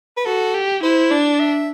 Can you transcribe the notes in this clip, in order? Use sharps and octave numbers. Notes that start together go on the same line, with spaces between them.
B4
F#4 A4
G4
E4 C5
D4 D5
E5